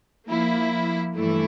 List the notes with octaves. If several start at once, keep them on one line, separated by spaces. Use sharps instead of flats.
F3 A#3 E4
G2 E3 A3 E4